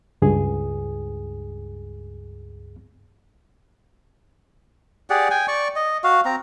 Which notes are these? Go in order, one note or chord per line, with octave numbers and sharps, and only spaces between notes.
C#2 G2 G#4
G4 G#4 D5 F#5
G5 G#5
D5 C#6
D#5
F#4 F5
C4 A#5